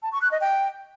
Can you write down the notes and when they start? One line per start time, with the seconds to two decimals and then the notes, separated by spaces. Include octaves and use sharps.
0.03 A5
0.12 C#6
0.22 F#6
0.31 D#5
0.41 G5